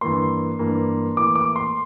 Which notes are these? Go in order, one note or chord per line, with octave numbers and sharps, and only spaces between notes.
G2 E3 A#3 C6
G2 E3 A#3
A2 E3 A#3 D6
D6
C6